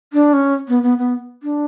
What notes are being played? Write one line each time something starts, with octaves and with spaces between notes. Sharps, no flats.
D4
C#4
B3
B3
B3
D4